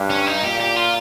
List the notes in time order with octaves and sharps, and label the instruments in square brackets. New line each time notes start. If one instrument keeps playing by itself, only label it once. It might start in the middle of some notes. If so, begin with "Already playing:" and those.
Already playing: [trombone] G2
[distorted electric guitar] C#4
D#4
[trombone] A#2 [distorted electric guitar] G4
[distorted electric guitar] G4
F4